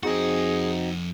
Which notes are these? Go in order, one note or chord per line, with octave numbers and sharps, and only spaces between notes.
F2 C4 D#4 F#4 G#4 F#5